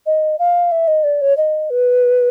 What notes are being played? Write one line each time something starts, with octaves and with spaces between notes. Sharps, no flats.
D#5
F5
E5
D#5
D5
C#5
D#5
B4